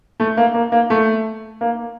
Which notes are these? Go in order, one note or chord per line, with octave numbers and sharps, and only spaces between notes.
A3
A#3
A#3
A#3
A3
A#3